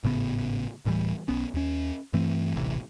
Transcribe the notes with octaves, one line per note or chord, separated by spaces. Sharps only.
G#1 A2 C#3 B3
D1 A2 E3 G3
B1 B3 C#4
D#2 C#4
G2 E3 A3 C4
D#1 A1 C3 E3